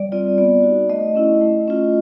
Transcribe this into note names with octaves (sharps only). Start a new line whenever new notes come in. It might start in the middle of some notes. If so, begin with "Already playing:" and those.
Already playing: G3 D5
C4 F4 D5
B3 D5
D#4 F#4
A3 D#5
C#4 E4
A3
C#4 F4